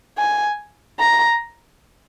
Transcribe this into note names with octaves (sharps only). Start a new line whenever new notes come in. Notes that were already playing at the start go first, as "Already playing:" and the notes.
G#5
A#5